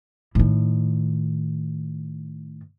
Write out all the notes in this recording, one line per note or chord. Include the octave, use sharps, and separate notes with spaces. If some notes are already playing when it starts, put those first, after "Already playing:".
A2 D#3